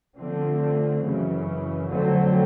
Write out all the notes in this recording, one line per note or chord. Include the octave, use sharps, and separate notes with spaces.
D3 F3 A3 C4
F#2 C#3 E3
F2 D3 F#3 A3 C4